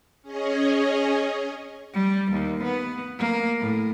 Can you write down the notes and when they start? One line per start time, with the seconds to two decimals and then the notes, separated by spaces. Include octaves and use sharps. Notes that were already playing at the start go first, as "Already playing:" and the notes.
0.22 C#4 G#4 C#5 D#5
1.94 G3
2.32 D#2
2.64 B3
3.19 A#3
3.60 A2